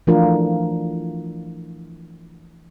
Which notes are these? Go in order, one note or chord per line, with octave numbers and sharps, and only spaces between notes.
E3 F3 A3 D4 F4 A#4